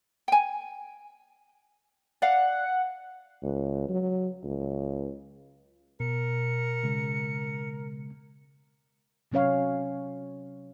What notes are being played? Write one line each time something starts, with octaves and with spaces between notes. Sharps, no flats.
G5 G#5
D5 F5 F#5
C#2
F#3
C#2
B2 A#4 C#7
C#3 G#3
C3 F#3 C#4 C#5 F5